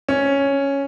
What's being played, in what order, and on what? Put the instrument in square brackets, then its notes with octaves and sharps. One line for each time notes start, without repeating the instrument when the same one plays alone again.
[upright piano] C#4